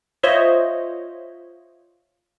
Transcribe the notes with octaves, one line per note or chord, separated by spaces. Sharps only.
F4 C5 C#5 D#5 E5